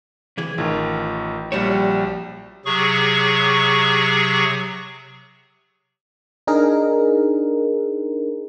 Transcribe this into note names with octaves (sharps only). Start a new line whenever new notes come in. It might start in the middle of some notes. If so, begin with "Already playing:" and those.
C3 E3 G#4
A1 D#3 F4
A#1 G3 F#4 G4 C#5 E7
C3 F#3 G#4 C#6
D4 D#4 G#4 A#4